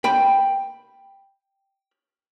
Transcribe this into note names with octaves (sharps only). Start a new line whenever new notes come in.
G5 B5